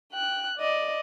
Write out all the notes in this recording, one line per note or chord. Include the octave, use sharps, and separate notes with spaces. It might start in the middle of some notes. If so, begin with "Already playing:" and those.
G5 F#6
D5 D#5